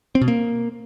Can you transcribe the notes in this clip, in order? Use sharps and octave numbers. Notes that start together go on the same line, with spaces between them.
C4
B2
A#3